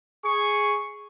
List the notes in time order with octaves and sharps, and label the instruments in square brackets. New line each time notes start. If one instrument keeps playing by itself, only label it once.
[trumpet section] G#4 C#6